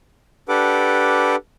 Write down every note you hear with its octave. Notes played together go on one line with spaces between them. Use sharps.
D4 G4 A4 B4 F#5 D6